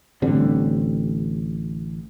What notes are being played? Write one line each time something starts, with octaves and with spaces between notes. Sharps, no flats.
A1 D3 G3 C4